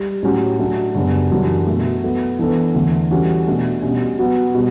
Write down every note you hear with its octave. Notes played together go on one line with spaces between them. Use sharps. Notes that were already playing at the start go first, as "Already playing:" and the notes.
Already playing: G3
A2 F#3 C#4 G4
F#3 A3 D4
F#2 C#3 G3 B3 D4
F#2 E3 G3 D4 F#4
B2 F#3 A3
F#3 B3 E4 A4
E3 B3 D4 A4
E2 D3 A3
E3 G3 C#4 F#4 A4
B2 A3 D4
B2 G3 C#4
F#3 B3 F#4
B2 G3